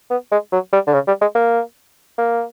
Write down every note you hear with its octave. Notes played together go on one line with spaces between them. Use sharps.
B3
G#3
F#3
G3
D3
C#3
G3
G#3
A#3
A#3